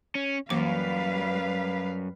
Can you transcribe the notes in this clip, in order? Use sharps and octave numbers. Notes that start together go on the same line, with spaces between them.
C#4
F#2 E3 G3 A#3 B4 F5 D6